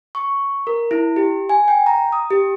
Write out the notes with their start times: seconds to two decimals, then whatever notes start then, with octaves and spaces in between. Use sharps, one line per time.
0.15 C#6
0.67 A#4
0.91 E4
1.16 G4
1.49 G#5
1.68 G5
1.86 A#5
2.12 D#6
2.30 G4